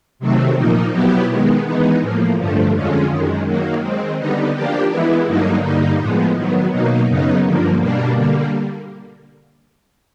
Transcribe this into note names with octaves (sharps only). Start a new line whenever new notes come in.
C3 D#3 F#3 A3 C4
A#2 F3 A#3 D#4
B2 F#3 B3 E4 G4
D#3 G#3 B3
E3 G#3 B3 D#4
A2 F3 A#3
G2 D3 F3 A3
F2 D3 F3 G#3 C#4
F#2 D#3 G#3
D#3 F#3 A#3
D#3 G#3 C4
D3 G3 B3 D#4
F3 A#3 D4 G4
E3 G#3 B3 E4
G2 D3 F#3 A#3 D#4
G2 D3 G3 A#3 D#4
A2 F3 G#3 B3
D#3 F#3 B3
B2 F#3 A#3 D#4
F#2 C#3 F#3 B3 D#4
G2 D3 F3 A#3
B2 G3 A#3 D4
D3 G3 A#3